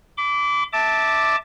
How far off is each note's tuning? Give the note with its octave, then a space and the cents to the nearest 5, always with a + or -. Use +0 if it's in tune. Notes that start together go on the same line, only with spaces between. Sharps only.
B5 +35 D6 -20
E5 -20 A5 +0 D6 +5